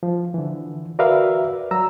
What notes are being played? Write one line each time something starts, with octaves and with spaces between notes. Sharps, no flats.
F3
D3 E3
F#4 A#4 B4 D5 E5 F5
F#3 A#5 E6